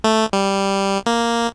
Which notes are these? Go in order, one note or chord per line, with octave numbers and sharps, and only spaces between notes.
A3
G3
A#3